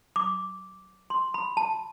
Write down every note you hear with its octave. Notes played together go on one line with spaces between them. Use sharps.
D6
C6
B5
A5